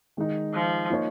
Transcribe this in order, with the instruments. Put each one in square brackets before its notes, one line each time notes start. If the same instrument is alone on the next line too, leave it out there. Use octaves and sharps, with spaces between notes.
[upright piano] D#3 G#3 D#4
[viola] F3
[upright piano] F3 A#3 D#4 C#5